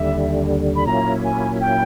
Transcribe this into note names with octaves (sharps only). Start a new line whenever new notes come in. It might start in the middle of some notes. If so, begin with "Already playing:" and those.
Already playing: D#2 D3 G3 E5
B5
A#2 F#3 A#3 C#4 E4 A#5
G#5
G5